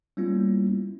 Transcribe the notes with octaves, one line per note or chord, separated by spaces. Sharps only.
G3 A#3 B3 C#4 E4 F4